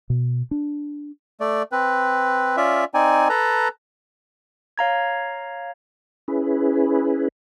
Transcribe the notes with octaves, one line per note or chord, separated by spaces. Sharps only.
B2
D4
A3 D5
C4 B4
C#4 F4 D5 E5
C4 D#4 D5 G#5
A4 B4 A5 A#5
C#5 F5 A#5 G#6
C#4 E4 G#4 B4